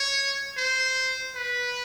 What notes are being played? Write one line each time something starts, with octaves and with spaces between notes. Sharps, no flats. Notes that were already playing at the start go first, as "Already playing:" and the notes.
Already playing: C#5
C5
B4